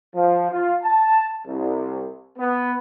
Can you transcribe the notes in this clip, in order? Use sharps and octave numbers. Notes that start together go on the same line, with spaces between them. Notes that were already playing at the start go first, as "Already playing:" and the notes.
F3
F4
A5
C2
B3